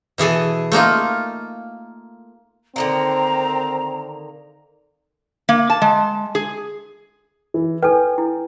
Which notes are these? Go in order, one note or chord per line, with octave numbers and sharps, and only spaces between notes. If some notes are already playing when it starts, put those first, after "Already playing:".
B2 E3 G#4 A4
A3 A#3 D#4 F4
D3 D#3 A#3 C4 A#5
A#3
A5
G#3
G#4
E3
A4 B4 G5 G#5
E4